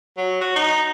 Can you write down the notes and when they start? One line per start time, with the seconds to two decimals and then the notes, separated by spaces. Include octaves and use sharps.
0.17 F#3
0.41 F#4
0.56 D#4